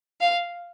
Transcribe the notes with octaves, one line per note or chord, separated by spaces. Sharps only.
F5